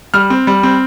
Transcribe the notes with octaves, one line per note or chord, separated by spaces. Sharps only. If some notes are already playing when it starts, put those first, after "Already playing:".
G3 F6
C4
G3
C4